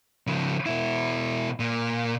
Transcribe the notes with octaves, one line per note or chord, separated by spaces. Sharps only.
C#3 F3
B2 E4
A#2